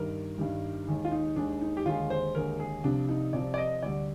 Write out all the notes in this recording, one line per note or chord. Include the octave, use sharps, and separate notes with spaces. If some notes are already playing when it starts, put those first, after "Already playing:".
Already playing: G2 D#3 G3 A#4
G2 D#3 G3
D#2 D#3 G#3
F4
D#4
D#2 D#3 G#3 D4
D#4
G4
D#2 D3 G#3 F4
C5
D#2 D3 G#3 A#4
G#4
C2 C3 F3 D4
D#4
C2 C3 F3 D5
D5
D#5
D2 D3 G3 D5